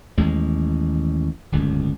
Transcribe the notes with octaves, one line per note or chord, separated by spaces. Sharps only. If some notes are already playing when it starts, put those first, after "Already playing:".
A1 D#2 G#3
D1 G1 C#2